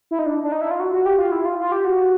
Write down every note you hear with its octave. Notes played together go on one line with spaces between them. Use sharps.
E4
D#4
D4
D4
D#4
E4
F4
F#4
F#4
G4
F4
E4
F4
F4
G4
F#4